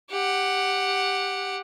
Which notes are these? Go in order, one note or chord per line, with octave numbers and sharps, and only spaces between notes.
G4 F#5